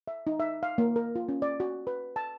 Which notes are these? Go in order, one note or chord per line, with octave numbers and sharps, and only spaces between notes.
E5
D#4
E5
F5
A#3
A#4
F4
C#4
D5
F#4
B4
A5